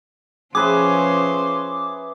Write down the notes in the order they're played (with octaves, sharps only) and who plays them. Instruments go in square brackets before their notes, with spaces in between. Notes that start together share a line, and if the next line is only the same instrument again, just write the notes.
[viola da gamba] F3 C#4 C5 [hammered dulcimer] G#4 B4 E5 [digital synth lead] D6